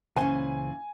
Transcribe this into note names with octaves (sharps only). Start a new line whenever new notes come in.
C#2 A#2 E3 C#4 C5 G#5